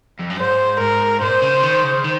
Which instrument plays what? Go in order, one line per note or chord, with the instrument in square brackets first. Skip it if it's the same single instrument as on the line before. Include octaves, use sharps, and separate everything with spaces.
[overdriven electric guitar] F2
F#2
[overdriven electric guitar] G#2 [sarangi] C5
[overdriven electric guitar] G#2 [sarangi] A#4
[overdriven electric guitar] A#2 [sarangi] C5
[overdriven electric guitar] C#3
D#3
C#3
D#3